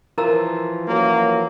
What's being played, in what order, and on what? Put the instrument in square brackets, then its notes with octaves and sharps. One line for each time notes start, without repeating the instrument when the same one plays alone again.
[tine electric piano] E3 F3 F4 [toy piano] A#4 A#5 E6
[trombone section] F#2 F#3 A#3